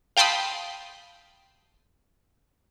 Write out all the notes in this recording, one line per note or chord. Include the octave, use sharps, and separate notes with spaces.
F5 G5 A5 B5 C6 D#6